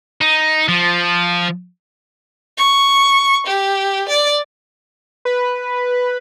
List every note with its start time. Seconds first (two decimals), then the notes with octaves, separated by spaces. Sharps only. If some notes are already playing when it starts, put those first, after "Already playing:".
0.21 D#4
0.68 F3
2.58 C#6
3.47 G4
4.09 D5
5.25 B4